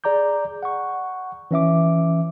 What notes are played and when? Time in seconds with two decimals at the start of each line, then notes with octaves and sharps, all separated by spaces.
0.04 G#4 D5 A#5 D6 G6
0.63 F#5 C#6
1.51 E3 C#4 E5 D6